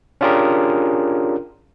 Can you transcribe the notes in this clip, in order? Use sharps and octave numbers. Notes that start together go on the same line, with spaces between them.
C#4 D4 F4 G4 G#4 A#4